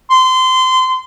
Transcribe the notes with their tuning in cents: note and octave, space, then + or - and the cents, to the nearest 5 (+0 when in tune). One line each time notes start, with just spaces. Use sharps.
C6 -25